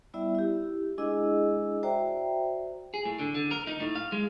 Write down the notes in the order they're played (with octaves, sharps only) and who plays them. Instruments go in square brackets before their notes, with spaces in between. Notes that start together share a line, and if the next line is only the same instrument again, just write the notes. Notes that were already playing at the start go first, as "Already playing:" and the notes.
[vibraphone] G3 B3 E4 D5 E5
E4 G4
G#3 D4 E4 G#4 D#5 E6
F#4 C5 D5 E5 G5 A#5
[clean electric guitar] G#4
A2
D3
D3
A#4
D#4
A2
F5
G#3